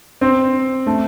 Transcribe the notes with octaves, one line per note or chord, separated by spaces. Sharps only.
C4
A3